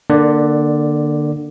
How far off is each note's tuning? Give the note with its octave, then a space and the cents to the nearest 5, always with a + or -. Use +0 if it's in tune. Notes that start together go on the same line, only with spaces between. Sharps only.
D3 +20 A#3 +0 D5 +0